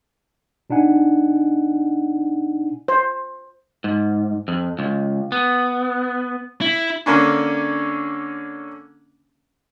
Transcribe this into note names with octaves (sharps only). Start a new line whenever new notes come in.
B2 D4 D#4 F#5 G#5
C5
G#2
F2
C#2
B3
E4
D3 A#3 C#4 D4